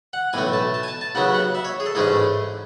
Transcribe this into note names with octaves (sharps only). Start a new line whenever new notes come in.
F#5
B1 A2 E3 A3 G#5
A5
A5
G#5
A5
A5
D#2 C#3 F#3 B3 F#5
F#5
E5
C#5
G#4
A4
A1 G#2 E3 A3 C#4 G#4